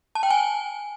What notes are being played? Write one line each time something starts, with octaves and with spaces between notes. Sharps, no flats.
A5
G5
G#5